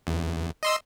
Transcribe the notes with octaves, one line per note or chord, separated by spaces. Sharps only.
E2
D#5 C6 E6